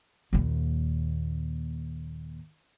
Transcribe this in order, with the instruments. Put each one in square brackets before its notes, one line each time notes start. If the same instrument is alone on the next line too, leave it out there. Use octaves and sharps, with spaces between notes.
[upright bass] D#2 A#2